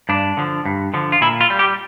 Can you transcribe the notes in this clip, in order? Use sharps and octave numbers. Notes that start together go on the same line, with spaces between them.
G2 D4
D3 F3
G2
D3 F3
F4
A#2 E4
F4
G3
G4